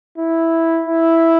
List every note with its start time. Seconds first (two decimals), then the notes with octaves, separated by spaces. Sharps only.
0.18 E4
0.87 E4